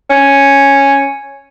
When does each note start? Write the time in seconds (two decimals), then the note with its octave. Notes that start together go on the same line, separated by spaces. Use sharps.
0.10 C#4